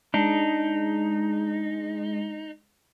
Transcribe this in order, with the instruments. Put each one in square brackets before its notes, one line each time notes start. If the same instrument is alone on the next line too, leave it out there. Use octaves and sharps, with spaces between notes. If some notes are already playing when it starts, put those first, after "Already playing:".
[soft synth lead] G#3 [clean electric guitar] D4 [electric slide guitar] D#4